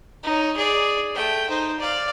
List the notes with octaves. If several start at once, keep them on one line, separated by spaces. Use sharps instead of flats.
D#4 C#5
G#4 D5
A3 G5
D#4 C5
D5 F5